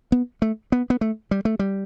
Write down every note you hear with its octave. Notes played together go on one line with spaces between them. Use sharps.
B3
A3
B3
B3
A3
G3
A3
G3